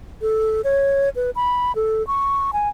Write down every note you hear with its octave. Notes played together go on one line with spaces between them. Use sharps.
A4
C#5
B4
B5
A4
C#6
G#5